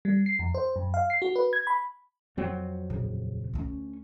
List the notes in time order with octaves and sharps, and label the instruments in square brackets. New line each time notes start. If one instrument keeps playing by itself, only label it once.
[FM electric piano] G3
C7
F2
C5
F#2
F5
C7
F#4
B4
G#6
B5
[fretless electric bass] F2 F#3 C4
[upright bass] D#1 C#3
D2 C#4